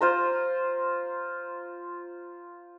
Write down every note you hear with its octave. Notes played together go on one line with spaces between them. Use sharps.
F4 C5 A#5